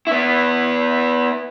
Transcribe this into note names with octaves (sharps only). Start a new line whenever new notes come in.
B3 E4